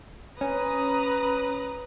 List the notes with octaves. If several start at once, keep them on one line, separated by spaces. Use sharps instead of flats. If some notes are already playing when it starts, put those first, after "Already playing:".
C#4 B4 A#5 D#6